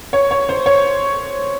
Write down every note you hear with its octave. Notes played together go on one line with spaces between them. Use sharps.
C#5
C#5
C5
C#5